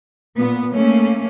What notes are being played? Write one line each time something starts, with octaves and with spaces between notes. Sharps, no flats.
A#2 B3
A3 A#3 C#4